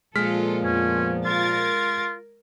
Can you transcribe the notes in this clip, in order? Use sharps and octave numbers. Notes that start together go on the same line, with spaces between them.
A#2 F3 G#3 F4 A4 F6 B6
F2 B3 C#4
F4 A#4 G#6 A6